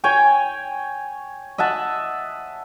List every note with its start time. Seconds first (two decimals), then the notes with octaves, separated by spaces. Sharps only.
0.04 C#5 G5 G#5
1.58 D#5 E5 F#5 A5